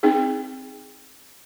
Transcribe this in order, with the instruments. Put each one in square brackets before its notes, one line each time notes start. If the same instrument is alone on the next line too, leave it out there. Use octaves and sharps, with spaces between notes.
[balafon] C4 D#4 G#4